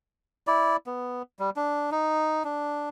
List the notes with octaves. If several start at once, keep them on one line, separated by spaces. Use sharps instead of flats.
E4 D5
B3
G3
D4
D#4
D4